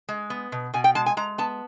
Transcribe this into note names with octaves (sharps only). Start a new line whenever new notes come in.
G#3
B3
B2
B2 G#5
G5
G#3 A5
G#5
G#3 A#5
B3 A5